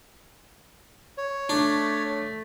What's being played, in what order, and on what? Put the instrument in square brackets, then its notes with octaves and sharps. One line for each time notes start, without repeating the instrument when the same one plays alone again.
[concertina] C#5
[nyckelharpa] A3 [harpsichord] D4